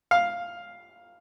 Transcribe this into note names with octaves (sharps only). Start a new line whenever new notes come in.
F5